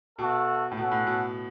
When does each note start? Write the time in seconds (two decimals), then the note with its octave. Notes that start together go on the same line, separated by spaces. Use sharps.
0.19 B2 A3 F#4 A4
0.71 A2
0.77 B2 C#4 A4 F#5
0.91 A2
1.07 B2